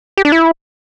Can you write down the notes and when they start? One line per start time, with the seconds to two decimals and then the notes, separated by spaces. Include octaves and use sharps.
0.17 G4
0.25 D4
0.32 E4